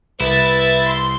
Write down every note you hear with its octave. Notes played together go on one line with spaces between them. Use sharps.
C2 E4 B4 E5 A6
C6